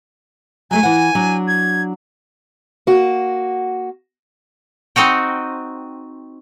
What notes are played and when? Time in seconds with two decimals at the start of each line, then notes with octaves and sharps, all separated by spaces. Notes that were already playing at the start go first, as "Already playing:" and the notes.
0.71 F#3 G#3 A3 G#5
0.83 E3 F#5
1.15 F#3 D4
1.48 G#6
2.87 A#3 F#4
4.96 C4 D#4 F#4 G5